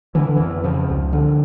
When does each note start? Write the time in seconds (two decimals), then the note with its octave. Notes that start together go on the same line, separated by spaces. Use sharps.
0.15 D3 E3
0.26 D3
0.36 F2 E3
0.64 C#3 F3
0.89 C#2
1.13 D3